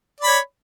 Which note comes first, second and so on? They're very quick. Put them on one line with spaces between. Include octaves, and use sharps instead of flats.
D5 B5 C#5